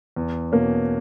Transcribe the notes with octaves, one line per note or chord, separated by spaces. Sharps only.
E2
B2 A#3 C#4